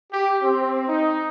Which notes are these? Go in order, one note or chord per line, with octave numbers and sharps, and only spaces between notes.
G4
C4
D#4